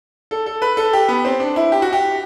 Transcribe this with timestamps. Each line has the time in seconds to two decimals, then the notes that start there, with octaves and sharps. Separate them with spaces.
0.31 A4
0.46 A4
0.62 B4
0.77 A4
0.93 G4
1.08 B3
1.25 C4
1.40 D4
1.56 E4
1.72 G4
1.82 F#4
1.93 G4